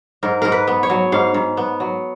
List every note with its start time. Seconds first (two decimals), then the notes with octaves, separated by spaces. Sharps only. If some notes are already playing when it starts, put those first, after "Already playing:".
0.23 G#2 A#4
0.42 G#2 A#4
0.52 B4
0.67 B3
0.83 C#5
0.90 F#3
1.12 G#2 F5
1.34 G#2
1.57 B3
1.80 F#3